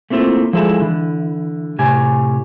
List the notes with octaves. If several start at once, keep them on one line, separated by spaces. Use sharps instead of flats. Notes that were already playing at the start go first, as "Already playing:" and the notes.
A3 A#3 C4 E4 F4
F3 G#3 E4 A4
D3 E3
A2 C3 G4 G#5